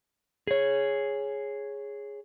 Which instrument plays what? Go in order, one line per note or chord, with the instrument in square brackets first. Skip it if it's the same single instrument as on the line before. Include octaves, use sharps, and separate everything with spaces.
[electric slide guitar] G#4 C#5